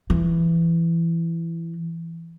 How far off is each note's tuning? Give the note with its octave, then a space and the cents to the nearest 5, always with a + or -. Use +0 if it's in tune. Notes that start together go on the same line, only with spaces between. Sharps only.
E3 +15